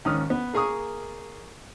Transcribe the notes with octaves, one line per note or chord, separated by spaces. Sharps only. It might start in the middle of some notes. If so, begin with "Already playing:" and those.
D#2 G#2 C#4 D#6 F6
B3
A#3 G#4 A#4 C#6 D#6